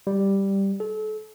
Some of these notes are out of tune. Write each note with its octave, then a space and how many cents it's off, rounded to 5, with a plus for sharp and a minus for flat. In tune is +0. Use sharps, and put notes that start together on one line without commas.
G3 +0
A4 -35